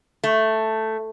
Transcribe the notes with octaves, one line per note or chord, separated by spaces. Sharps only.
A3